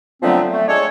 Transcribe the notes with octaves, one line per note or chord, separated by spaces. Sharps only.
D3 F3 F#3 A3 B3 C4
A3
G#3 D4 A4 C#5